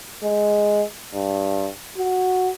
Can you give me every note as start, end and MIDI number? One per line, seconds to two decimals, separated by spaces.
0.24 0.84 56
1.14 1.69 43
1.98 2.51 66